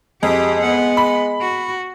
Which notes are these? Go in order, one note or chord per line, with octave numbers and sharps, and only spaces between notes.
F2 G#3 G4
B3 F#5
B5
F#4